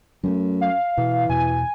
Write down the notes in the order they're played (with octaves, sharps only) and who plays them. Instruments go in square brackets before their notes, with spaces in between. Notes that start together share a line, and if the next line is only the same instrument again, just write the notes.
[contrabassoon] F#2 [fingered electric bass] F#3 G#3 A3
[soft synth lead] F5
[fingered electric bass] B2 [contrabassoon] E3
[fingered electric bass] E2 B2 [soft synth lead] G#5